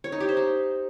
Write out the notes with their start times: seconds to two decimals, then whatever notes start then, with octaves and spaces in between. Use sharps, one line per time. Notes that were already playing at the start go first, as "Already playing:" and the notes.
0.04 C#5
0.12 D#4
0.20 G4
0.29 C5
0.37 D#4